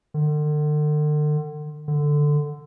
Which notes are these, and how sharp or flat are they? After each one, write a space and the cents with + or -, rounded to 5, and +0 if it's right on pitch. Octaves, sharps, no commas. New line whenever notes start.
D3 +40
D3 +5